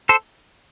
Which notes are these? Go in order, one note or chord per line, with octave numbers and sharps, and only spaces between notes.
A4 C5